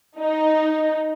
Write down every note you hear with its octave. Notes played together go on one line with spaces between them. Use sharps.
D#4